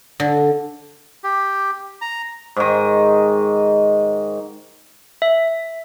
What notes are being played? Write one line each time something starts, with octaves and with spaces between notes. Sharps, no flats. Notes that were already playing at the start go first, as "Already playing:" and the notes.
D3
G4
A#5
G#2 D#3
E5